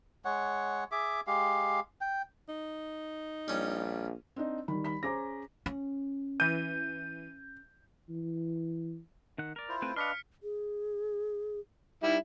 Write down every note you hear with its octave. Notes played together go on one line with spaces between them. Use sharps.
G#3 C#5 F#5
G#4 E5 D6
G#3 G4 F5
G5
D#4
A#1 G3 C#4
C4 D4 D#4
D#3 G3 B5
B5 B6
C#4 G#4 C5 A#5 D6 A#6
C#4
E3 G6 D#7
E3
D#3 F#5
A#4 D5
E4 F4 C5
A3 C4 B4 D7
D4 B4 D#5 F5 C6 F6 B6 C#7
G#4
G3 D#4 E4